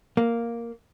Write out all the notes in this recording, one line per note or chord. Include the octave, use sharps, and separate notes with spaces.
A#3